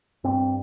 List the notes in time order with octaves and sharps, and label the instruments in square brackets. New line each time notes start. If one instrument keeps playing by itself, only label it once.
[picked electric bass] G2 C4